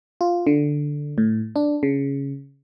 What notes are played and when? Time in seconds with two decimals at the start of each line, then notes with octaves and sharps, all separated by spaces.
0.21 F4
0.47 D3
1.18 A2
1.56 D4
1.83 C#3